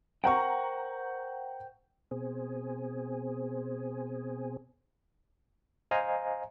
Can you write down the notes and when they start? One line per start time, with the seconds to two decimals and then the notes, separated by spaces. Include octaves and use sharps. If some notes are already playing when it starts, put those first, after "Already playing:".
0.24 A#4 C5 F#5 G5 A#5 C#6
2.11 B2 C4 G#4
5.91 C5 D#5 F5 G#5 A#5